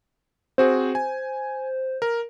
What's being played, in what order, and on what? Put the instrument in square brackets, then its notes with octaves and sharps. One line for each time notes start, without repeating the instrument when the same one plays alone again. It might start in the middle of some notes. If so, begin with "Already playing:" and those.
[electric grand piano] C4 F#4 G#4 [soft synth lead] C5
[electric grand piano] G#5
A#4